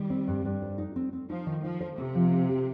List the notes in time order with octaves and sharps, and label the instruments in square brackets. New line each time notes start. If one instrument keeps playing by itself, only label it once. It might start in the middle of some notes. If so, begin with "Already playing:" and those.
Already playing: [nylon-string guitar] D#3 [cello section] G3
[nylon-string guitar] C4
G2
G2
C5
D#4
C4
C4
[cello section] F3 [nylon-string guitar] D#4
[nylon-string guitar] D#3
[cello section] F3 [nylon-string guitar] D#4
[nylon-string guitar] C5
[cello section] C3 [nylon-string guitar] C4
[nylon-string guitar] F3
C4
G4